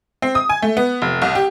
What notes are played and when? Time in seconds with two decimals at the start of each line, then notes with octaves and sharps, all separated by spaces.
0.22 C4
0.35 D#6
0.49 G#5
0.62 A3
0.77 B3
1.02 F1
1.22 C2
1.35 G4